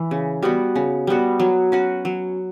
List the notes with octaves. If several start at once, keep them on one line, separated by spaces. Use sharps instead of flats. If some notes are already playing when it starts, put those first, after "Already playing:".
Already playing: E3
C#3
G3 B3 F#4
C#3
G3 B3 F#4
F#3
C#4 F#4 B4
F#3